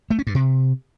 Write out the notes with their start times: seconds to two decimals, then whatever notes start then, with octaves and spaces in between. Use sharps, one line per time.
0.10 A3
0.19 C#4
0.27 G2
0.35 C3